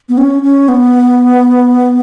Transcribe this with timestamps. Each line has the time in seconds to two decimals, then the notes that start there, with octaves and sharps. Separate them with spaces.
0.09 B3
0.18 C#4
0.42 C#4
0.68 B3